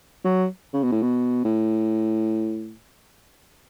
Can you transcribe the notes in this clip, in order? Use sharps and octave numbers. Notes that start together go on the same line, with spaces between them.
F#3
C#3
B2
A2
B2
A2